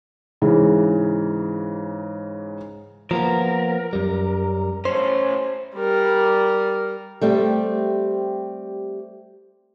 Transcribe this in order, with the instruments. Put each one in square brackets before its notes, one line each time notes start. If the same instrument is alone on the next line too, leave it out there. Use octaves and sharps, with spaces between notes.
[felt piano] G#2 C#3 E3
[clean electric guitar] F3 A#3 B3 [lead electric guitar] A#4
[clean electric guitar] F#2 G3
[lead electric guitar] A2 C#4 [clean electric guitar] C5
[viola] G3 A#4
[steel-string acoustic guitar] G3 A3 C4 G4